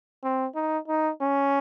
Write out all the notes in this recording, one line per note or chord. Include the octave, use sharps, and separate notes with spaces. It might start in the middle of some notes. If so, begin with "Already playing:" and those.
C4
D#4
D#4
C#4